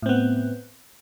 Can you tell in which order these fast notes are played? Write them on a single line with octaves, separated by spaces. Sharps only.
A2 C4 B3